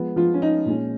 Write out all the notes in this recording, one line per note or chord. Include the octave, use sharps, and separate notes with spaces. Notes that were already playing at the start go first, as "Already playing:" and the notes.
Already playing: F3 G#3 B3
F3 F4
C#4
D#4
A#2 G#3 C#4